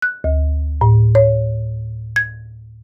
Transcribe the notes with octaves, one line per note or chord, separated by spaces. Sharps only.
F#6
D2
A2
C#5
G#6